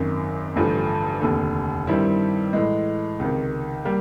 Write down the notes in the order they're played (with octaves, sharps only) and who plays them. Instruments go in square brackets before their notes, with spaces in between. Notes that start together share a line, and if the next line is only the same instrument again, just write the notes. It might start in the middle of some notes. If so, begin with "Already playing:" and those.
Already playing: [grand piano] G#1 F#2 D#3
A1 G2 D3 F3 A3
F1 D#2 D3
G2 D#3 G3 C4 E4
A2 E3 G#3
C#2 C3 D#3
G3 A#3